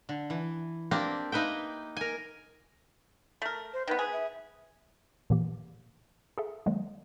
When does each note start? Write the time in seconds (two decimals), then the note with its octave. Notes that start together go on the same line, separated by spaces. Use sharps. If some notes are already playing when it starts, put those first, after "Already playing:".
0.09 D3
0.30 E3
0.91 A#3 C4 D4 G4 A#4
1.32 A#3 D#4 B4 E5 G5
1.97 A#4 G#5
3.42 A3 A#4
3.73 C5
3.88 D#3 B3 B4
3.99 G#4
4.13 E5
5.30 A#2 E3 A#3 G4
6.38 G#4 A4 E5
6.66 D#3 F#3 G#3 A#3